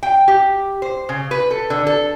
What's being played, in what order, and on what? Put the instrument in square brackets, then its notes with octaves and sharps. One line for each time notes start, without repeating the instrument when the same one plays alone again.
[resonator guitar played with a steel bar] G5
G4
C5
C#3
B4
A4
D3
A4